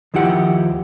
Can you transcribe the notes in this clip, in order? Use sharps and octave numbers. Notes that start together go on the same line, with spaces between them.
D#2 F3 E4 G4 F#5